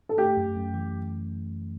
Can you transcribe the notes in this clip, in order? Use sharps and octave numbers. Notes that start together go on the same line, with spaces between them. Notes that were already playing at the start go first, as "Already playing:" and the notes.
A4
A3 G4
F#2
F#2
E3